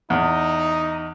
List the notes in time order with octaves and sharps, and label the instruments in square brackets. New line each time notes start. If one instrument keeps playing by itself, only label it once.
[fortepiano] E2 [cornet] D#4